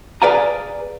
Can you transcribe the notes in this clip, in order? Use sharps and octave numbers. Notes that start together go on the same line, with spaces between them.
G#4 B4 D5 F5 G#5 A#5